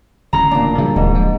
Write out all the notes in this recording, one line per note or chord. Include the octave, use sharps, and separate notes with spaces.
D1 A1 C#3 A#5 C6
A#2 D4
G2 C#3 F3 F#3
D1 D#2 G#2
F3